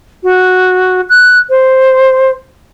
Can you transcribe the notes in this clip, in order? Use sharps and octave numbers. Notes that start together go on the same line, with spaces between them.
F#4
F#6
C5